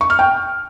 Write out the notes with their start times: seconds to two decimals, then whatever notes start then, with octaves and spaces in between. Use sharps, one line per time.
0.01 C#6
0.10 F6
0.19 G5